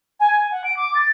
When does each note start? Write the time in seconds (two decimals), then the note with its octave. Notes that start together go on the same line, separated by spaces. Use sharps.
0.20 G#5
0.33 G#5
0.51 F#5
0.64 D7
0.77 D6
0.95 A6